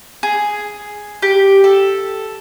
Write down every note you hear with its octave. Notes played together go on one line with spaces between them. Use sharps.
G#4
G4
A4